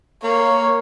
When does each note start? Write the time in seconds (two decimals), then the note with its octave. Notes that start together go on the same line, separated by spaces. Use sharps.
0.24 A#3 C#5